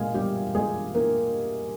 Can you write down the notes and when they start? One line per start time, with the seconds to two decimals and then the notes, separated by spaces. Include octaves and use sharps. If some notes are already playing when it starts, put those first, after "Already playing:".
Already playing: A#2 G#3 A#3 G#4 F5
0.14 G3 G4
0.55 G#3 G#4
0.94 A#3 A#4